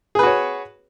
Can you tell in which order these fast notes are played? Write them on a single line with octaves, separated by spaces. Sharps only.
G#4 B4 F#4 C#5